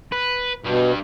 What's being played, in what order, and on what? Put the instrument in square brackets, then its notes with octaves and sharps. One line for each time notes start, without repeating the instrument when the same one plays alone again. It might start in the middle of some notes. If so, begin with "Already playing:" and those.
[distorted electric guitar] B4
[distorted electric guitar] G2 G3 [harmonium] B2